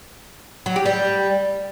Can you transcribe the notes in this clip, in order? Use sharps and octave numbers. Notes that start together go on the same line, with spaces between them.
F#3
G4
G3